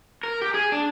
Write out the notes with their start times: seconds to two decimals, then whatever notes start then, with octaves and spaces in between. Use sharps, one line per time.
0.23 A#4
0.42 G4
0.54 G#4
0.72 D4